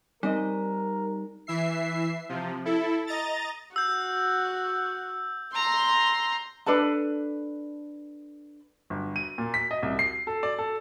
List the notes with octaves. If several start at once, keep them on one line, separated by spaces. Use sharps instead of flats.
G3 C4 D#4 A#4 D#5
E3 E5 C7
C3 F3
E4 A4
D#5 A#5 A6
F#4 E6 G6
A#5 C6
D4 A4 B4 A5
G1
D#7
A#2
B6
D#5
C2
C7
A4
D5
A4